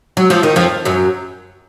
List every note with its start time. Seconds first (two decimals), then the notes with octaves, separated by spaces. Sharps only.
0.17 F#3
0.30 F3
0.43 D#3
0.56 F2 F3
0.85 F#2 F#3